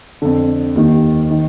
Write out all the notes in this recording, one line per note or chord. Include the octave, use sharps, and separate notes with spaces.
F2 D3
D#2 D#3
D#3